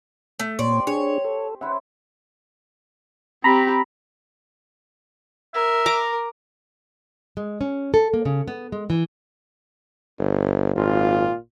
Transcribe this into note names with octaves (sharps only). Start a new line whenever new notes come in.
A3
A#2 C4 G4 C#5 D5 C6
D4 G#4 C#5
A4
C#4 E4 C5 E5 F#5
C4 G4 A#5 B5
A#4 E5
A#5 D6
G#3
C#4
A4
A#3
C#3
B3
G#3
E3
G1
G#1 A#2 F4